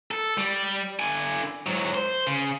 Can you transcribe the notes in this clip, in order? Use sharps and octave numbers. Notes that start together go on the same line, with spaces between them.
A4
G3
D3 G#5
G#2 F#3
C5
C#3